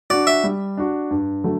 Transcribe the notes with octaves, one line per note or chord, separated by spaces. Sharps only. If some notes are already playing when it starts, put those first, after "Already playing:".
D4 F#4 D5
E5
G3
D4 F#4
G2
D3 F#3 A3